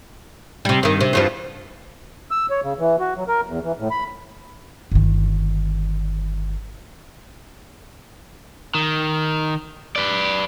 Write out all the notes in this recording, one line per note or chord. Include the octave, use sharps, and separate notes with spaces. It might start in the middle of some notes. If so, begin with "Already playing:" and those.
C3 G3
G2 D#3
C3
E2 G2 F3
E6
C#5
C#3
E3
F#4
F#3
A#4
E2
E3
A2
B5
G1 D#3
D#3
B4 D5